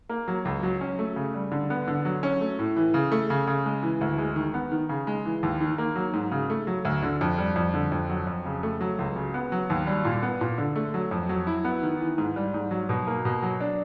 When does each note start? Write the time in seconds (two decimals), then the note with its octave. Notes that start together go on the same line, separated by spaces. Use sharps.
0.09 A#3
0.28 F#3
0.45 C#2
0.63 F#3
0.81 C#4
0.99 A3
1.16 C#3
1.34 G3
1.52 D3
1.70 B3
1.88 D3
2.05 F#3
2.23 C#4
2.41 A3
2.59 A2
2.76 E3
2.94 C#3
3.12 A3
3.30 C#3
3.47 C#3
3.66 G#3
3.83 E3
4.01 D2
4.18 G#3
4.36 D#3
4.54 B3
4.71 D#3
4.89 C#3
5.07 G#3
5.25 E3
5.43 D#2
5.60 D#3
5.78 A#3
5.96 F#3
6.14 G#2
6.31 C#3
6.50 A3
6.67 F#3
6.85 D2
7.03 D3
7.21 F2
7.38 G3
7.56 F2
7.74 D3
7.92 F2
8.09 F#3
8.27 F2
8.45 C#3
8.63 A3
8.81 F#3
8.99 C#2
9.16 C#3
9.34 B3
9.52 F#3
9.70 D#2
9.87 G3
10.05 A#2
10.23 B3
10.41 A#2
10.58 D3
10.76 A3
10.94 F#3
11.11 F2
11.29 F#3
11.47 E4
11.64 B3
11.83 D#3
12.00 E3
12.18 G#2
12.36 G3
12.54 G#2
12.71 F#3
12.89 B2
13.07 A#3
13.25 B2
13.42 F#3
13.61 D4